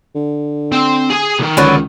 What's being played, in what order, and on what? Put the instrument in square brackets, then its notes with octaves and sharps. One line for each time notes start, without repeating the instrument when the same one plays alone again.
[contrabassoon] D3
[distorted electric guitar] C4
G#4 G#5
C2 D#3
[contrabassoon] C#2 [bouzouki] D3 F#3 B3